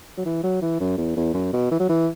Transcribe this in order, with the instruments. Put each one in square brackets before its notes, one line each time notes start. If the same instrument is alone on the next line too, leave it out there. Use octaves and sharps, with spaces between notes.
[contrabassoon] F#3
E3
F#3
E3
F#2
E2
E2
F#2
B2
E3
F#3
E3